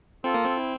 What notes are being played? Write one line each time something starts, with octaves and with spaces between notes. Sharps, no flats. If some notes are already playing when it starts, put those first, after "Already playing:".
C4 F4 A4
A#3
C4
E4